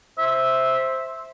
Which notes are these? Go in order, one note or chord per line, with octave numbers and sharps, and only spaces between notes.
C5 E5